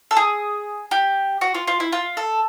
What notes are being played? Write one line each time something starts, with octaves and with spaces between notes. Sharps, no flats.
A4
G#4
G4
F#4
F4
F4
E4
F4
A4